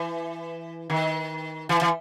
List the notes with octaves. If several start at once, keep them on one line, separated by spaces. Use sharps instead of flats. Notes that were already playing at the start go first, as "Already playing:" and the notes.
Already playing: E3
D#3
E3
E3